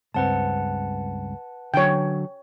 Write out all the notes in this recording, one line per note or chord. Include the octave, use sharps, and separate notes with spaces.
C#2 G2 C4 B4 F#5 A5
D3 F#3 C#5 G5